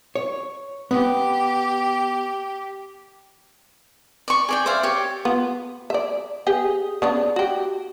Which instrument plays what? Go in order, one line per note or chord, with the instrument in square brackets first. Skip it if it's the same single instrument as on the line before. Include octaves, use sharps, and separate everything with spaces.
[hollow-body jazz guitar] C#5
[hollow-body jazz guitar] B3 [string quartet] G4
[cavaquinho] D5 C#6
G#4 D5 G5
C5 D5 E5 F5
G4 C#5
[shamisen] B3 F4
D5 E5
B3 G4 G#4
C#3 B3 D4
F#4 G4